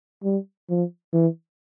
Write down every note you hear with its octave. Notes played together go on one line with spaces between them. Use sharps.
G3
F3
E3